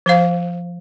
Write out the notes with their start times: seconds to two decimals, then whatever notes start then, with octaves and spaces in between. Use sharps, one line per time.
0.06 F3 C5 F5